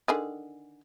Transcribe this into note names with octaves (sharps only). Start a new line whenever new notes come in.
D3 D#3 G#4